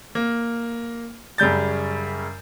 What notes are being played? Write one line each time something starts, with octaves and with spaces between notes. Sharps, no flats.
A#3
F#2 C#3 G3 G6 A6